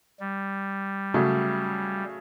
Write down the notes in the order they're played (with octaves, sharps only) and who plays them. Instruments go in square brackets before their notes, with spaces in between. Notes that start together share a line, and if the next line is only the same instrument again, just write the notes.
[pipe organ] G3
[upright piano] C#3 F#3 A3